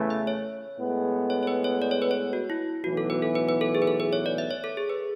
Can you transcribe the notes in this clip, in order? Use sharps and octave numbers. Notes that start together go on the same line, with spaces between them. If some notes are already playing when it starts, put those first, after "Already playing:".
Already playing: E2 C#3 E3 A3
E5
C#5
A2 G#3 B3
C#5
C#5
B4
C#5
D5
C#5
B4
C#5
F#4
E4
B1 A2 E3 B3 F#4
A4
B4
A4
B4
B4
A4
G#4
B4
A4
B4
C#5
D5
E5
C#5
A4
G#4
B4